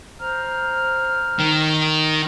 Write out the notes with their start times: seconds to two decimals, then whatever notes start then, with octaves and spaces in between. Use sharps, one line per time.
0.19 C5 A#5 F6
1.39 D#3